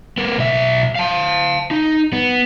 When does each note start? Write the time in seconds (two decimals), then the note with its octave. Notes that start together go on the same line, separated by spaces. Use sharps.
0.18 B3 A#4
0.38 B1 E5
0.95 F5 A5
1.71 D#4
2.13 B3